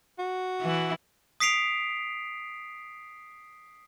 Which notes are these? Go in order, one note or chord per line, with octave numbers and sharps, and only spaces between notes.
F#4
E3 E4
D#6 B6 C7 D7 F7